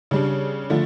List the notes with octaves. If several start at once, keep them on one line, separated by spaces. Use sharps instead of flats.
C#3 G3 D4
D3 F3 A3